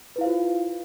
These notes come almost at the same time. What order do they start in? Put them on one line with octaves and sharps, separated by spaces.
B4 E4 F5 C5 F4